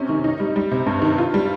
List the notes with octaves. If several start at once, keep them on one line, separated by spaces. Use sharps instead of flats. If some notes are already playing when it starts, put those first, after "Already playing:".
Already playing: C3 C#4
D#3
D#4
G3
G3
C3
G2
D#3
F4
G3